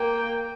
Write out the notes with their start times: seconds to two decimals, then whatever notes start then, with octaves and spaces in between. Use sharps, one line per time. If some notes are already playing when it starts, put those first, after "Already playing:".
Already playing: A#3 G5